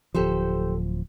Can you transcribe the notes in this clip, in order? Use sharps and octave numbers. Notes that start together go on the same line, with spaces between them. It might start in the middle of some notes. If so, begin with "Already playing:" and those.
D1 F3 G4 A4 C5